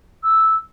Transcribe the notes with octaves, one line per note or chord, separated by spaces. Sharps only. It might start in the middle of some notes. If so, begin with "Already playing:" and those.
E6